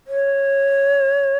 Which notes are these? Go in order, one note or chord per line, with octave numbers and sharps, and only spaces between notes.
C#5